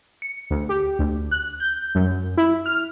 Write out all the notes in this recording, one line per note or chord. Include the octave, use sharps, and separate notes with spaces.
C#7
D2
G4
D2
F#6
G6
F#2
E4
F6